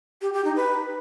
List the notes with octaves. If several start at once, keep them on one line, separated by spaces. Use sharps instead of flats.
G4
G4
D#4
B4